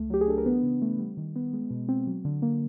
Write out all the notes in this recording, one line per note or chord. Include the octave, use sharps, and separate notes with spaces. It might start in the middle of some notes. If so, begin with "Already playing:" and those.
Already playing: C#2 A3
F#3 G4
G#4
D4 A4
A#4
E3 B3 B4
C#3
A3
G3
D#3
B3
G#3
B2
C4
F#3
D3
A#3